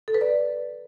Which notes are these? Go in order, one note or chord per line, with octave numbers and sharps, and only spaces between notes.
A4
B4
D5